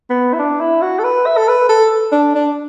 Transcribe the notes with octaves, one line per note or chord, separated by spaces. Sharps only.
B3
E4
D4
E4
F#4
A4
B4
E5
A4
B4
A4
D4
D4